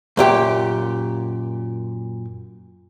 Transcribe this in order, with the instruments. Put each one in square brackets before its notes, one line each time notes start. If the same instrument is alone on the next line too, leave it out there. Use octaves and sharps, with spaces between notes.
[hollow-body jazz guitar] F#2 A#2 G4 G5